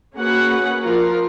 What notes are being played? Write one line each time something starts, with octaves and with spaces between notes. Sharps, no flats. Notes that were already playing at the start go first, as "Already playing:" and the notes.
A#3 C#4 F#4 G#4 B4 F#5
F3 F4 A#4